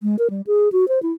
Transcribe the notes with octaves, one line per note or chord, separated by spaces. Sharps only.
G#3
A#4
G3
G#4
F#4
C5
E4